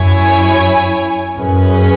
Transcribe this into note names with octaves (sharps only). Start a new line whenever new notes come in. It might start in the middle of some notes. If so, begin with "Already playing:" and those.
Already playing: F#2 E4 C#5 G#5
F#2 C#4 G#4 B4